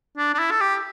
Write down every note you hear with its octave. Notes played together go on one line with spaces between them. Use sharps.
D4
D4
E4
A4
G4